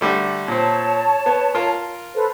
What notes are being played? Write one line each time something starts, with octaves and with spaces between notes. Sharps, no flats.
D3 G3 A3
A#2 C4 C#5 A5
B3
F4 A#4 F5
A4 B4 C5